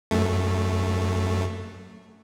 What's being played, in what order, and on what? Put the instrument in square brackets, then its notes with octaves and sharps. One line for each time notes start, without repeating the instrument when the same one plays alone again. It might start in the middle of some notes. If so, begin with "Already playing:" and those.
[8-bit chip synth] F#2 A3